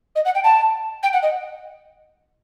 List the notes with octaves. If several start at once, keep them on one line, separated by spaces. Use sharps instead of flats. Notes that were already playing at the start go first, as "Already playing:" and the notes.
D#5
F#5
G5
A5
G5
F#5
D#5